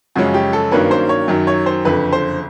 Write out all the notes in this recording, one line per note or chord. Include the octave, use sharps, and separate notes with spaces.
F#2 C#3 F3 G#3 C#4 F#4
G4
A4
G2 D#3 F#3 A#3 C#4 B4
C5
C#5
F#2 D#3 F#3
C#5
C5
F#1 F2 D3 B4
C5